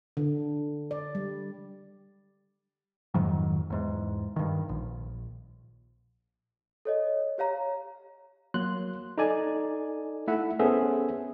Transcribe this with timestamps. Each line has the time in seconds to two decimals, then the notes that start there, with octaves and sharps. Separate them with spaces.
0.17 D3
0.91 D5
1.15 G3
3.14 F2 G#2 D#3 F#3
3.70 E2 G#2
4.36 G2 D#3
4.69 A#1
6.85 A4 C#5 D#5
7.38 G4 C#5 F5 A#5
8.54 F#3 A#3 C6 F#6
9.18 D#4 A4 D5 G#5
10.28 A3 E4 E5 F#5
10.60 B3 C#4 G#4 A4 C5 E5